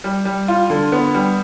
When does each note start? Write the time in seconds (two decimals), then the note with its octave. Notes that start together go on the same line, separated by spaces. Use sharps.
0.04 G3
0.25 G3
0.48 F4
0.70 D3
0.92 B3
1.15 G3